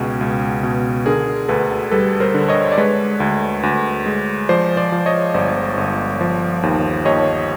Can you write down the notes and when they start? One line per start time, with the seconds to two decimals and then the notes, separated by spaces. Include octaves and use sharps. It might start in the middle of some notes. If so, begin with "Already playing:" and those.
Already playing: C#2 B2 F#4 G#4
0.21 C#2
0.63 B2
1.06 D3 G#4 A#4
1.48 D2 A4 B4
1.91 G3 A4 B4
2.20 A#4 C5
2.34 D3
2.49 C#5 D#5
2.72 D5
2.78 G#3 B4 C#5
3.20 D2
3.63 D2
4.06 G#3
4.49 F3 C5 D5
4.77 C5 D5
4.92 F3
5.06 C#5 D#5
5.34 G1 C5 D5
5.77 G1
6.21 F3
6.63 D#2
7.05 D#2 C#5 D#5